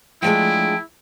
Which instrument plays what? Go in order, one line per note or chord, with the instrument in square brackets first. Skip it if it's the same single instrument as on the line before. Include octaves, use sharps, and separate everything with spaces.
[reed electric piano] F3 A3 [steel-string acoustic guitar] G#3 D4 F4 [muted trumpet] E4 [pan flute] G5